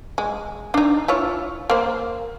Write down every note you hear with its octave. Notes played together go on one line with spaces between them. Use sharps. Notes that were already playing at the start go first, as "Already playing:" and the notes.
G#3
D4 D#4
E4 F4 C#5
A#3 C5